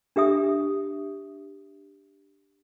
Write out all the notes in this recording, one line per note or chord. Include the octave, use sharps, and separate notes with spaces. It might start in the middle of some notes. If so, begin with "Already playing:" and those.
D4 G4 E5 D#6